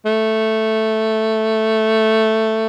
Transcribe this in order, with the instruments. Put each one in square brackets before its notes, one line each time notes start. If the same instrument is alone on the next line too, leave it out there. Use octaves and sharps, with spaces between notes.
[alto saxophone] A3